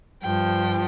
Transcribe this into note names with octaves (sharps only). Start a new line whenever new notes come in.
G2 F3 G5